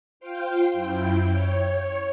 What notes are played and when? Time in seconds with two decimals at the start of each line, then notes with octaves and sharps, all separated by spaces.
0.20 F4 C5 F5 G5
0.73 F#2 E4 G5
1.31 C#5